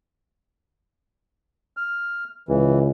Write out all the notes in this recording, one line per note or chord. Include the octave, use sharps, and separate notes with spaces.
F6
C#2 E3